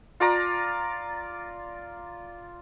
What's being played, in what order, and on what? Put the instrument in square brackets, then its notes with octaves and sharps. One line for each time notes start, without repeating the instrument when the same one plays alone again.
[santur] F4 D5 A#5